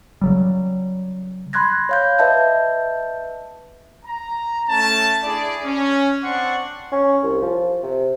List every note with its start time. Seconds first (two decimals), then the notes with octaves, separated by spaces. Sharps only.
0.21 C#3 F#3 G3
1.53 B5 C6 F#6 G#6 A#6
1.89 C#5 F5 G6
2.19 B4 D#5 E5 A5 G6
4.06 A#5
4.69 A3 C#4 A5
5.24 D4 E4 G#4 D5
5.64 C#4
6.23 C4 D4 D5 F#5 C6 C#6
6.92 C#4
7.23 C2
7.42 F3
7.83 C3